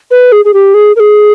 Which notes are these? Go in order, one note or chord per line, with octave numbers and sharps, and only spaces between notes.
B4
G#4
G#4
G4
G#4
A#4
G#4